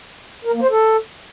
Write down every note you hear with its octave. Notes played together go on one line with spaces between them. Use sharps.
A#4
A#3
C5
A4